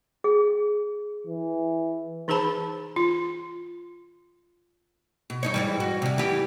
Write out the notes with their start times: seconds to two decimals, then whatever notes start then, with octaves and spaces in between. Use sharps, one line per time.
0.24 G#4
1.27 E3
2.28 E3 D#4 G#4 C5 A5 B5
2.96 F4
5.30 B2
5.43 G2 D#4 C#5
5.54 G#2 E3 G3
5.80 F#4
6.02 C3 G3
6.18 E3 G4